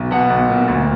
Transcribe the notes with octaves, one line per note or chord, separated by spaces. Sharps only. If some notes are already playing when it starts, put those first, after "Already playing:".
Already playing: B1
B2 F#5
B1
A#2
D2